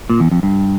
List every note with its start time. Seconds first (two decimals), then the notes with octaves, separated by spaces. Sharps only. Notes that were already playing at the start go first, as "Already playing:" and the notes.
0.10 A#2
0.20 E2
0.31 F2
0.43 G2